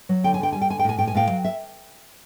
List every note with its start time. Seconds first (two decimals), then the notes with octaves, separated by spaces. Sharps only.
0.09 F#3
0.24 D3 G5
0.34 G#5
0.39 D3 G5
0.52 G3 G#5
0.61 G5
0.70 D3 G#5
0.79 G5
0.84 A2 G#5
0.98 A2 G5
1.07 G#5
1.15 A2 F5 G5
1.30 F#3
1.44 E5